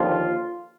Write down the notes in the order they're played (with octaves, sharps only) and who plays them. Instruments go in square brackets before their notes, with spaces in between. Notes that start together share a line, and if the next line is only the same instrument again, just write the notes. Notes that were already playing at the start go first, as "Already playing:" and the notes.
Already playing: [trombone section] D#2 D3 F3 F4